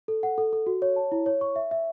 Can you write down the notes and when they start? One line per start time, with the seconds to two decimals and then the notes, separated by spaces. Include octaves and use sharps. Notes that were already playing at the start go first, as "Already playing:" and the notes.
0.08 A4
0.23 F#5
0.38 A4
0.53 A4
0.67 F#4
0.82 C#5
0.96 A5
1.12 E4
1.26 C#5
1.41 C#6
1.56 E5
1.71 E5